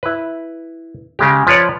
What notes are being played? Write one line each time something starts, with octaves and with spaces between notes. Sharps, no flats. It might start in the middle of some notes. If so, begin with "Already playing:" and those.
E4 B4
C#3 G#3 G4
F3 B4 C#5 D5